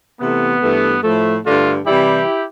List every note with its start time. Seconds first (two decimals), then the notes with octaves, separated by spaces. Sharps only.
0.21 C3 E3 A3 B3
0.63 G2 E3 A3
1.04 A2 F3 A3
1.46 G2 D3 A3 D4 F4
1.87 C3 E3 G3 E4 G4